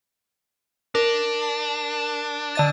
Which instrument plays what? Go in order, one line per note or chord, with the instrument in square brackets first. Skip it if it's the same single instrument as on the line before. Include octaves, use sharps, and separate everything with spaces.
[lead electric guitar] D4 [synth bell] A#4
[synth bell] D3 D#5 A6